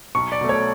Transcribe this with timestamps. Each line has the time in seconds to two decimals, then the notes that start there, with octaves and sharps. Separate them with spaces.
0.15 B1 C#6
0.32 D5
0.41 B2 A3
0.49 C#5